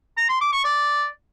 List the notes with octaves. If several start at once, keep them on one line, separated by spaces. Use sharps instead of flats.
A#5
C6
D6
C#6
D5